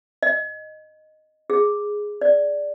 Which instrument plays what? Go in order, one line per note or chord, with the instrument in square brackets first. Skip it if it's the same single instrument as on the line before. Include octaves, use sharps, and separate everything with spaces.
[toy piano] D#5
G#4
D5